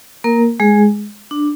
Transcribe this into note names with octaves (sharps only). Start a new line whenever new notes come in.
A#3 A#4
G#3 G#4
D4